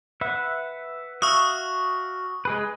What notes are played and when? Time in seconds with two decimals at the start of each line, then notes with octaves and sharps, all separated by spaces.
0.21 B4 E5 F#5
1.22 F#4 E5 F5 C#6 D#6
2.45 G#3 G#4 B4